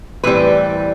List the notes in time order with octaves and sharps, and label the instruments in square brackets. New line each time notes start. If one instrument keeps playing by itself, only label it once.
[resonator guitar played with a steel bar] A2 E3 G3 C4 B4